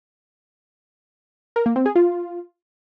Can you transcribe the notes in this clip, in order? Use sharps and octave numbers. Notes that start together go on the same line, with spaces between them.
A#4
A#3
C4
G#4
F4